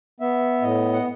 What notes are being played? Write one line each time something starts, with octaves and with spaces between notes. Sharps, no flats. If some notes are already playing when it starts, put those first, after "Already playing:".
B3 E5
A2 D#5
F#5